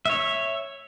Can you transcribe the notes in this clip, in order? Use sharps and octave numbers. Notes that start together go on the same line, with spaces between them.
C#5 E5